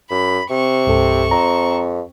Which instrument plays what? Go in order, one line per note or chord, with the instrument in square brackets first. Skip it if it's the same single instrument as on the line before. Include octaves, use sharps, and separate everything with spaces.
[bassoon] F#2 [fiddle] B5
[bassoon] C3 [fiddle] C4 C#6
[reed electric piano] C2 G2 A4
[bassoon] F2 [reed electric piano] A#5